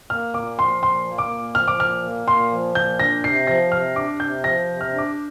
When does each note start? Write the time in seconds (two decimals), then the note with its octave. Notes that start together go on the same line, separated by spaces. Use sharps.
0.10 A#3 F6
0.34 A#2 D6
0.59 F3 C6
0.82 A#2 C6
1.07 A#3
1.18 D6
1.30 A#2
1.54 F3 F6
1.68 D6
1.79 A#2 F6
2.03 A#3
2.27 A#2 C6
2.51 F3
2.75 A#2 G6
3.00 D4 A#6
3.24 C3 C7
3.47 F3 A#6
3.71 C3 F6
3.95 D4 D6
4.20 C3 G6
4.44 F3 A#6
4.68 C3
4.81 F6
4.93 D4
4.98 D6